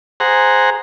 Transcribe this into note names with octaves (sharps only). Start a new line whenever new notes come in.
G#4 C5 F#5 A#5